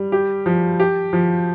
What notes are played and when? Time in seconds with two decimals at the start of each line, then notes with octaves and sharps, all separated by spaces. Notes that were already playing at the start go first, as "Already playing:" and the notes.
Already playing: G3
0.12 G4
0.46 F3
0.80 G4
1.13 F3